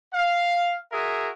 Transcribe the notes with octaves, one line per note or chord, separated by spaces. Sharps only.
F5
F#4 G#4 A#4 E5